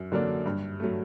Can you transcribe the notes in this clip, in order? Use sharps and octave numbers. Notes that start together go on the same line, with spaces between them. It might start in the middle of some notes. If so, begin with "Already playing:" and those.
Already playing: F#2
D3 F#3 A#3 D4
G2
F#3 A3